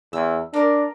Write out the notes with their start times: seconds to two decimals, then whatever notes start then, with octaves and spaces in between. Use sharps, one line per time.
0.13 E2 E6
0.54 A#3 D4 A#4